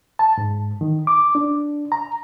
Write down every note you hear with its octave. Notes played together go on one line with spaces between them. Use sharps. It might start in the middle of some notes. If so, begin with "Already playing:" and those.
A5
G#2
D#3
D6
D4
A#5